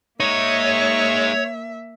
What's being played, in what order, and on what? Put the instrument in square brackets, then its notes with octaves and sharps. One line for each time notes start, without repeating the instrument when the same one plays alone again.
[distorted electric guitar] G#3 D#4 [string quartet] A#3 E5 [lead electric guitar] C#5